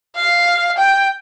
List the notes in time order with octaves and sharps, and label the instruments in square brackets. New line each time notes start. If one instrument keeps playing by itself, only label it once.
[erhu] F5
G5